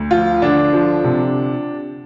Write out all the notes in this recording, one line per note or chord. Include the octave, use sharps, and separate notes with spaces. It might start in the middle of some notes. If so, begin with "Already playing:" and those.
Already playing: D2
F3 F4
D3 D4
F3
C3